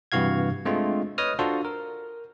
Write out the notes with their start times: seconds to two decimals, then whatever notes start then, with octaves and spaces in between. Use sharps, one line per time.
0.12 G2 C3 E3 F#4 F5 G#6
0.65 G#3 A3 C4 D4 F4
1.18 B4 C#5 D#5 D#6 F6
1.39 D4 F4 F#4 A4 C5
1.65 A#4